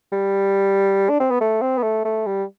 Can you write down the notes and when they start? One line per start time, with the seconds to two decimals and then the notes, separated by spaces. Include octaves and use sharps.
0.12 G3
1.09 D4
1.20 C4
1.31 B3
1.41 A3
1.62 C4
1.78 B3
1.83 A3
2.05 A3
2.26 G3